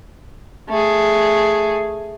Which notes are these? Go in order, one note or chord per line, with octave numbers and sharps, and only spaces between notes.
A3 G#4